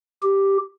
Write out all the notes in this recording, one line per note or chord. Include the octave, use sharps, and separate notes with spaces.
G4